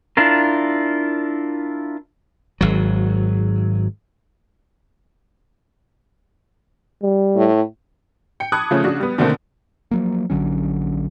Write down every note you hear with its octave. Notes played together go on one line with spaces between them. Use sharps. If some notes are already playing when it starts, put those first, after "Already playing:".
D4 E4 F4 A#4
G#1 F#3
G3
A2
G5 C#7
A5 B5 D6 D#6 F#6 G#6
C#3 F3 A3 C#4
C#3 D4 F#4
G3 B3
B2 D3 D#3 A3 A#3 C4
F3 F#3 A#3
A#1 D3 F#3 C#4